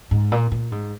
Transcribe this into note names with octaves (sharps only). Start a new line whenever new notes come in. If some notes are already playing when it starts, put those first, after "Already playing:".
G#2
A#2
A#2
G#2